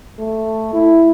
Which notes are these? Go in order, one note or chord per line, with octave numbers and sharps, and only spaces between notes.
A3
E4